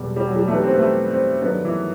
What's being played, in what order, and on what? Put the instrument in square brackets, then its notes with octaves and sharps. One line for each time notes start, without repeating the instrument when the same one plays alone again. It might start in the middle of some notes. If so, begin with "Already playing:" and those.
Already playing: [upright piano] E2 B2 A3 [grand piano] F#3 G3
[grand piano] G3
F#3
G3
[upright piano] E3 G3 D#4 G4 B4 [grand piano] A3
[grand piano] C4
B3
A3
C4
[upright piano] G2 D#3 F#3 A3 [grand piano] B3
[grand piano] E3